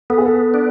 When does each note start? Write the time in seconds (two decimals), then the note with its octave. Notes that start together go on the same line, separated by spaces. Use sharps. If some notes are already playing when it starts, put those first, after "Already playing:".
0.10 B3 A4
0.18 G#4
0.26 A4
0.54 D4